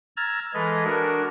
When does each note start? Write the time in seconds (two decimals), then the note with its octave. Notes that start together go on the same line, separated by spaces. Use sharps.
0.17 A#5 E6 F6 G#6 A6
0.54 E3 G#3 A4 B4 D#5
0.84 D4 F#4 A#4